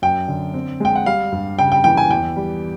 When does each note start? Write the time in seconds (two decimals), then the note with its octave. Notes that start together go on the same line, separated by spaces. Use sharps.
0.02 F#2 G5
0.28 D3
0.54 C4
0.80 G#3 G5
0.96 F#5
1.06 G3 F5
1.32 G2
1.59 C#3 G5
1.72 G5
1.84 E3 G5
1.97 G#5
2.11 E2 G5
2.36 G3